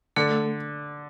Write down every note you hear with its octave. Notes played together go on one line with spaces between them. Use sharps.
D3 A3 A4